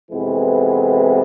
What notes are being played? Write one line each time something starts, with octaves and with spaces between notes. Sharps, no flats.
F2 C3 E3 G#3 B3